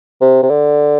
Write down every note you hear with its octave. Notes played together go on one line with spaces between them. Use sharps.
C3
C3
D3